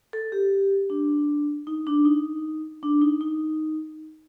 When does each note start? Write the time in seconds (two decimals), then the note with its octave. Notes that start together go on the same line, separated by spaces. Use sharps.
0.13 A4
0.32 G4
0.90 D4
1.67 D#4
1.87 D4
2.05 D#4
2.83 D4
3.01 D#4
3.21 D#4